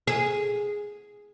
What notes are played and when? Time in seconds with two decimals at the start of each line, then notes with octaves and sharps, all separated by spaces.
0.07 G#4